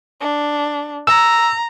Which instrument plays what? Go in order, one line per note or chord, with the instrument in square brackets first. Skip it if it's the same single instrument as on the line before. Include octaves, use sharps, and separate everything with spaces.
[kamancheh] D4
[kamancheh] A#5 [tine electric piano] E6